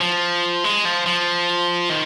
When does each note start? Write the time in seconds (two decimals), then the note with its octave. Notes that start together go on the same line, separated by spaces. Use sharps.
0.01 F3
0.64 G#3
0.85 F3
1.06 F3
1.89 D#3